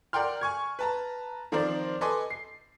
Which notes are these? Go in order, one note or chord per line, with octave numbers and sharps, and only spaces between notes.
A#4 D5 F#5 G5 C6 F6
G#5 C#6 G#6
B4 A5 A#5
D#3 F3 C4 A#4 C5 D5
A4 B4 D#5 G#5 C6 D6
C7